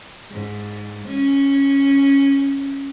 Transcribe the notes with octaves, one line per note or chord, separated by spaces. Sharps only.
G#2
C#4